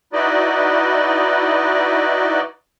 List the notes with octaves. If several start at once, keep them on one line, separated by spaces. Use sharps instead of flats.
D#4 E4 F#4 B4 D5 D#5